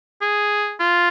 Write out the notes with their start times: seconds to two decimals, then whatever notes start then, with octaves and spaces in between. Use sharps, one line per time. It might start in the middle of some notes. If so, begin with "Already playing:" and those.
0.22 G#4
0.80 F4